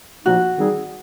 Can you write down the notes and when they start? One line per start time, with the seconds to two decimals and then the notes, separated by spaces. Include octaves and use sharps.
0.25 A#2 F3 A#3 D#4 F#4
0.57 D#3 G3 C4 D#4 G#4